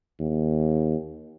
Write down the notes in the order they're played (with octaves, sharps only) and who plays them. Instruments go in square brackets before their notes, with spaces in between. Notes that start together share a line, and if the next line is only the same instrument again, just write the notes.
[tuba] D#2